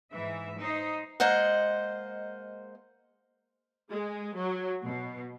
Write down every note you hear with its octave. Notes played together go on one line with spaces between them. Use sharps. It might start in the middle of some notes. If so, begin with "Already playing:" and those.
G#2 E3 E5
D#4 C5
G#3 A#3 C5 D#5 F#5
G#3
F#3
B2